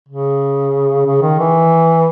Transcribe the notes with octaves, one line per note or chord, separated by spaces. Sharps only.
C#3
C#3
D#3
E3